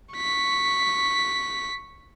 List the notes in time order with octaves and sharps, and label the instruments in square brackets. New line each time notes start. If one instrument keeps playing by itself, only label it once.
[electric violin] C#6 B6